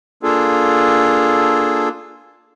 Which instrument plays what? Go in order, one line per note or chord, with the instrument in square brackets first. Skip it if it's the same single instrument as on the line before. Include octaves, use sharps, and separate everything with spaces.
[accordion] A#3 D4 F4 G#4 A4